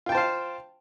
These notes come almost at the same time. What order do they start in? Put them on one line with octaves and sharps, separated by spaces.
F4 G5 A5 C5 F5